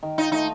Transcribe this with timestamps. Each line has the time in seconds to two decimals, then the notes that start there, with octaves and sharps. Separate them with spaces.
0.03 D#3
0.18 D#4 F4
0.32 A3 D#4